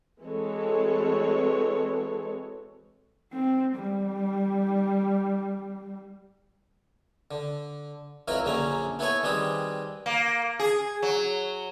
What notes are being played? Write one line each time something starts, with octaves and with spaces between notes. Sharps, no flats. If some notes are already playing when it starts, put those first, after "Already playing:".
E3 G#3 C4 F#4 A4 C#5
C4
G3
D3
F2 F#3 E4 A#4 B4
A#1 F#2 D3 F#3 C#4 A#5
B3 E4 A4 B4 C#5 G#5
D#3 G3 C4 G#4 B4 D#6
A#3
G#4
F#3